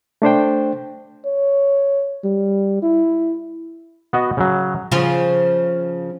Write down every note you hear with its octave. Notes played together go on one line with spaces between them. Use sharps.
A3 D4 C5 G5
C#5
G3
E4
B3 F#4 D#5
C#3 F#3
C#3 F3 F4